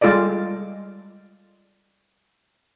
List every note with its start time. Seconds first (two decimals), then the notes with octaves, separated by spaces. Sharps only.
0.01 G3 G#3 F4 A4 D5 D#5